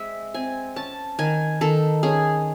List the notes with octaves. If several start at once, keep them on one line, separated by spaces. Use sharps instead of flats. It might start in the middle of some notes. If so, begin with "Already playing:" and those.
Already playing: G#3 C4 E5
C4 G#5
C#4 A5
D#3 G#5
D#3 A4
C#4 G#4